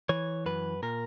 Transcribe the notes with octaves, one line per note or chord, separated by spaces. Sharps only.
E3 C#5
F#2 B4
A#2 A#4